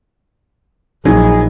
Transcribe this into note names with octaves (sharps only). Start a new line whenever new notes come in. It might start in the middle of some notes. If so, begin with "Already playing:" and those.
A#1 F#3 D#4 G#4